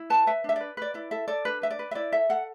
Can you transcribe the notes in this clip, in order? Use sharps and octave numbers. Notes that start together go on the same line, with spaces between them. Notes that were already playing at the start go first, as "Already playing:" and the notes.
Already playing: E4
B4 A5
B4 E5
D4 E5
B4 D5
B4 D5
E4 D5
A4 E5
A4 D5
D4 B4
B4 E5
D5
B4
E5
E4 D5
A4 E5
A4 F#5